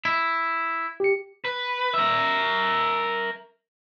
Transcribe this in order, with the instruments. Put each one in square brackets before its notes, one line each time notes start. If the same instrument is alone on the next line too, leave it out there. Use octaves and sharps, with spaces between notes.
[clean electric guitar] E4
[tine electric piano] G4 C#7
[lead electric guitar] B4
A#4 E5